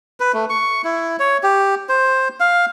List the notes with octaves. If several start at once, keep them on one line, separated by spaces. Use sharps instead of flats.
B4
A3
C#6
E4
C#5
G4
C5
F5